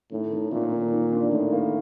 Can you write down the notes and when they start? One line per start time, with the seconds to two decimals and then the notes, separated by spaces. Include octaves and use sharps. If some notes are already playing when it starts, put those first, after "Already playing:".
0.12 A2 D#3
0.32 D#3
0.52 A#2 D#3
0.72 D#3
0.92 D#3
1.12 D4
1.32 A2 D#3
1.52 A#3